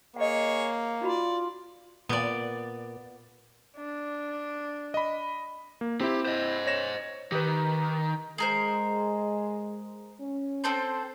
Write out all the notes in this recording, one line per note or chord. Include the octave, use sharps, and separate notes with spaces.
A#3 G#4 C#5 D#5 F#5
D#4 F4 F#4 D5 B5
A#2 B3 D5
D4
D#5 B5
A#3
C4 E4 G4
C5 D#5
C#5 A#6 E7
D#3 G4 B4
G#3 G#4 A#4 C5
C#4
C4 A4 C5